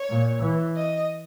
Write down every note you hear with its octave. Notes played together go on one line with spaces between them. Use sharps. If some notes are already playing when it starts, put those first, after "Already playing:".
Already playing: C#5
A#2
E3
D#5